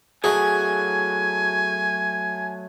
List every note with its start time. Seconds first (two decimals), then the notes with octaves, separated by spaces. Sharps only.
0.24 F#3 A3 F#4 G#4 G#5